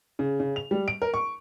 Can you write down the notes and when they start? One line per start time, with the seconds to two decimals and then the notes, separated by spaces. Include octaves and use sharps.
0.19 C#3
0.40 C#3
0.56 F7
0.71 G3
0.88 D7
1.02 A#4
1.14 C#6